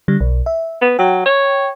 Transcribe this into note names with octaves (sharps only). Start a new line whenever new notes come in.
D3 G3
B1
E5
B3
F#3 G5
C#5